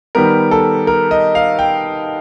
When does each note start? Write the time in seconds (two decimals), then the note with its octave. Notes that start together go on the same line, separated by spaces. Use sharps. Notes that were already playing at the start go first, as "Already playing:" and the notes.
0.15 D#3 G3 B3 A#4
0.51 A4
0.87 A#4
1.11 D#5
1.35 F5
1.59 G5